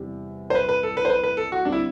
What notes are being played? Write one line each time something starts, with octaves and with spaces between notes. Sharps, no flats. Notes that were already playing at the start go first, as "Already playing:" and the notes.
Already playing: E2 C3 G3
C5
B4
B4
A4
B4
C5
B4
B4
A4
F#4
D3 G3 C4 D4
E4